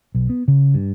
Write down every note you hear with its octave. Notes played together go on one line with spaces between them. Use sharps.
B1
B3
C#3
G2